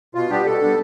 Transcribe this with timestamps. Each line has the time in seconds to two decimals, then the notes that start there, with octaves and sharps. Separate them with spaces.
0.15 B2 F4
0.30 G3 B3 D4 G4
0.46 B2 A4
0.61 G3 B3 D4